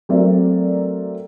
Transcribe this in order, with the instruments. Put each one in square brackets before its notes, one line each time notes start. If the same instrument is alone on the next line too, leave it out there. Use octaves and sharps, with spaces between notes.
[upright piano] F#3 A3 C4 A#4 D5 E5